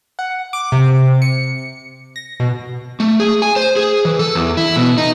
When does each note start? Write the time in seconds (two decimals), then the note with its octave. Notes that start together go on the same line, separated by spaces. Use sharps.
0.19 F#5
0.53 D6
0.72 C3
1.22 C#7
2.16 A#6
2.40 B2
3.00 A3
3.20 G#4
3.42 G#5
3.56 C5
3.76 G#4
4.05 E3
4.19 A4
4.35 E2
4.57 E4
4.76 B2
4.98 D#4